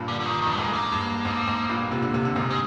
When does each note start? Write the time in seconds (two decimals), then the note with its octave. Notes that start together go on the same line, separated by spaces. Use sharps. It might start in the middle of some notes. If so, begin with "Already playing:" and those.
Already playing: G2 A#2
0.08 D3
0.20 D3
0.25 D#3
0.42 G2 D#3
0.58 G#2 A#3
0.66 G#3
0.73 A#3
0.92 G2
1.25 G#2
1.47 G#2
1.69 G2 A#2
1.91 C3
2.02 D3
2.14 C3
2.25 D3
2.36 G#2 C3
2.50 G#3